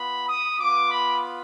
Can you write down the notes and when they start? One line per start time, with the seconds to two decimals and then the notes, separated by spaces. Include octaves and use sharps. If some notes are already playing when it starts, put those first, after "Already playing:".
Already playing: B3 F4 B5
0.27 D#6
0.59 B3 F4 D6
0.90 B5